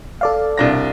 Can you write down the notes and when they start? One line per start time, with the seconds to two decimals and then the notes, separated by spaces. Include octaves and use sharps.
0.21 A4 D5 F5
0.58 C2 D4 A#6